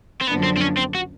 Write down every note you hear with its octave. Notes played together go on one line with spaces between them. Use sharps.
C4
F#2 D3 F3 A#3 B3 D4
C4
C4
C#4
C4
F#4